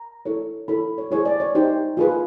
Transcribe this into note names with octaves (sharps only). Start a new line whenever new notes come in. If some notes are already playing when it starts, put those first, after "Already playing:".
Already playing: A#5
E4 A4 C#5
E4 A4 C#5 B5
C#5
E4 G#4 C5 C#5
D5
C#5
D#4 G4 C5
F4 G#4 B4